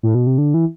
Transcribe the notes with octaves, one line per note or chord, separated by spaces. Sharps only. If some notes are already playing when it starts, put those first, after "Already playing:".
A2
B2
C3
D3
E3